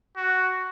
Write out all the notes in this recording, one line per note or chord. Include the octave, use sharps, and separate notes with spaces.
F#4